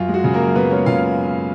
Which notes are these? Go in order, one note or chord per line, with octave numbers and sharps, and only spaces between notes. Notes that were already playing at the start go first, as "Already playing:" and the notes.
Already playing: F#2 F4
G#3
F#4
C#3
A#3 A#4
F#2
F#2 B3 B4
G#3 C#4 C#5
C#3 F4 F5